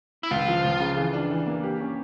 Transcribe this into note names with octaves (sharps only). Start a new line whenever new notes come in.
E4
C#2 F4
F3
C#2
C#3
E3
D4
E3
A#3
G4
C#4